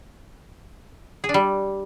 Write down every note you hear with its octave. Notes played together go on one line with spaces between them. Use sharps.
G#4
D4
G3